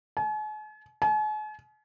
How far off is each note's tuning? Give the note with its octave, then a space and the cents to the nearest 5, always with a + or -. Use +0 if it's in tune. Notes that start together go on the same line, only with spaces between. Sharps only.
G#5 +45
G#5 +45